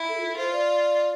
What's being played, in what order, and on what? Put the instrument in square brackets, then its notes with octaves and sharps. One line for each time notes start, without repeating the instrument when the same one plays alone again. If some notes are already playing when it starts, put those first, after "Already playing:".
Already playing: [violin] E4
[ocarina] A4
F4
A4
[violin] F4 [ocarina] C5
[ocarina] D5